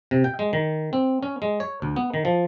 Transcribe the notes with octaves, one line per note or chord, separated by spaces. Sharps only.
C3
G5
G#3
D#3
C4
C#4
G#3
C#5
D2
B3
D#3
F3